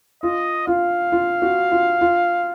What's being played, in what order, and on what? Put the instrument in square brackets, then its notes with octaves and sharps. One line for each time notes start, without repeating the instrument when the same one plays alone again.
[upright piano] F4 [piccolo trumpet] D#5
[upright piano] F4 [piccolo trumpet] F5
[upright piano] F4
F#4
F4
F4